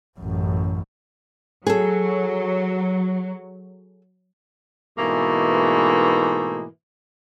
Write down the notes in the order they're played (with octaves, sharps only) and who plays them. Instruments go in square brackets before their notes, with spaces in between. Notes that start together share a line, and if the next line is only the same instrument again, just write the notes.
[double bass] A1 F#2
[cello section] F#3 [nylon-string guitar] G#4 A4
[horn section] G#2 B2 E3 A3 A#3 G#4